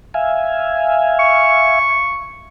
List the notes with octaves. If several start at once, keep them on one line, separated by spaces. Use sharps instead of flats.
E5 F5 G#5
C#6